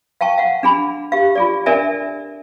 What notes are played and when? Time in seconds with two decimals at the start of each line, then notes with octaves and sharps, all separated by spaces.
0.21 F5 G5 A5 C#6
0.38 F5 F#5
0.63 D4 G#4 B5
1.12 G4 F5
1.35 F4 G#4 D5
1.66 D4 A4 A#4 D5 E5 G#5